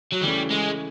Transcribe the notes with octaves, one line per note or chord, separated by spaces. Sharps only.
F#3
C#3 E3 G3 A3 C#4
G#3